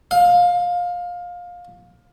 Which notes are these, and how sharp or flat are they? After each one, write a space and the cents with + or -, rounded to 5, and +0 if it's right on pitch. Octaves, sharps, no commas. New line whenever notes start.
F5 +20